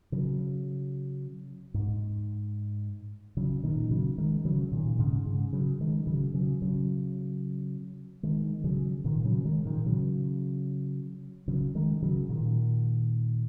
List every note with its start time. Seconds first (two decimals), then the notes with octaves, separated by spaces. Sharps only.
0.12 C#3 F#3
1.74 G#2
3.37 C#3 F#3
3.64 A#2 D#3
3.91 C#3 F#3
4.18 D#3 G#3
4.45 C#3 F#3
4.72 A#2 D#3
4.99 G#2 C#3
5.25 G#2 C#3
5.53 C#3 F#3
5.80 D#3 G#3
6.07 C#3 F#3
6.34 C#3 F#3
6.62 C#3 F#3
8.23 D#3 G#3
8.64 C#3 F#3
9.04 A#2 D#3
9.24 C#3 F#3
9.45 D#3 G#3
9.65 A#2 D#3
9.86 C#3 F#3
11.48 C#3 F#3
11.75 D#3 G#3
12.02 C#3 F#3
12.29 A#2 D#3